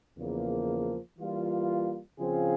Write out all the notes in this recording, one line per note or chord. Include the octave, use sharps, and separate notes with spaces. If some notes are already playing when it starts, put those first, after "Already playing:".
E2 C#3 F3 A#3
E3 G3 A#3 F4
C#3 F3 C4 F4 G#4